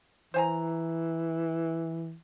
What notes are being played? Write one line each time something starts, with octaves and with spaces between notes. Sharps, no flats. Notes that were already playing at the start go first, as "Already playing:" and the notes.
E3 C5 G#5 A#5